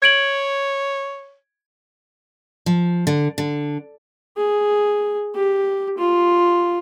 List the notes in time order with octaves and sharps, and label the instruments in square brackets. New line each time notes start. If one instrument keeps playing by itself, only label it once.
[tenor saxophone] C#5 [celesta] G#6 D7 F#7
[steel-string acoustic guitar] F3
D3
D3
[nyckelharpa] G#4
G4
F4